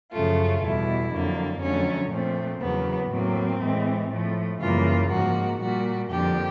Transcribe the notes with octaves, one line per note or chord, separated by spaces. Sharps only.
F#2 C#3 F3 A3 F4
E2 B2 G3 E4
F2 D3 F#3 A#3
F2 D3 F#3 A3 C#4
A#2 F3 A3 C4
E2 C#3 F#3 A#3 B3
A2 F#3 A#3 C4
A2 E3 G#3
A2 F3 A3
F#2 C#3 E3 G3 A#3 F4
G#2 F3 A#3 F#4
A#2 G3 A#3 F#4
F2 D3 F3 A#3 G4